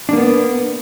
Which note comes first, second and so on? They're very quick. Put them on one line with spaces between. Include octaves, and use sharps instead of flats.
D4 A#3 B3